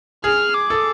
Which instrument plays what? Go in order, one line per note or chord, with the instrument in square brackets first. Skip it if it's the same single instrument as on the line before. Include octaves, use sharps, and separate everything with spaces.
[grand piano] G#4 [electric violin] F6
[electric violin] D6
[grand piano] A4